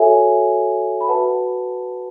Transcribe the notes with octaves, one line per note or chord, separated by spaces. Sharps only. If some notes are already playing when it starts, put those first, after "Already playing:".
Already playing: F#4 A4 C#5 E5 G#5
B5
F#4 B4 F#5 A5